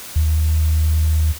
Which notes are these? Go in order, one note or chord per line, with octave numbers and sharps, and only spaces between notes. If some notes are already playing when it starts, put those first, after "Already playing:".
D#2